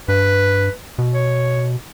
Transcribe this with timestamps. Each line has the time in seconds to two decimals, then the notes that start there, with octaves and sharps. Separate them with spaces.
0.08 G2 B4
0.98 B2
1.13 C#5